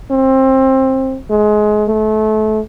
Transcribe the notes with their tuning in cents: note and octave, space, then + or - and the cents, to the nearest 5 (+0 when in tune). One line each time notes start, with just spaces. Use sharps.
C4 +20
G#3 +25
A3 -30